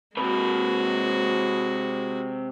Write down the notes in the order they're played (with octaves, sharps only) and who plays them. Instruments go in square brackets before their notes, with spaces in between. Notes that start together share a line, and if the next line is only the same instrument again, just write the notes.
[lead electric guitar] C3 B4 [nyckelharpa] G#3 F#4